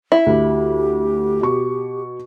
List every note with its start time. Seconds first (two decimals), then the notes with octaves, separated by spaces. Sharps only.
0.12 E4
0.26 D2 G4
1.41 B2 C#6